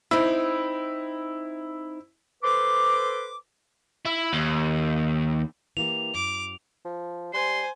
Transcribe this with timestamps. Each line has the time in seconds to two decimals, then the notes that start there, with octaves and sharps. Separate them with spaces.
0.11 C4 D#4 E4
2.43 A4 B4 C5 C6 D6
4.05 E4
4.33 D#2
5.77 E3 A#3 G4 F7
6.15 F#2 D6
6.85 F3
7.33 G3 C5 G#5 C6